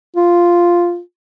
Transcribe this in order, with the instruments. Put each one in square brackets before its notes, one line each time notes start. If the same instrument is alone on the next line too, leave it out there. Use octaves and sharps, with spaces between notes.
[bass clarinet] F4